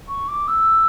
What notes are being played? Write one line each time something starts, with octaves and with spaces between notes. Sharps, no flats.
C#6
D6
E6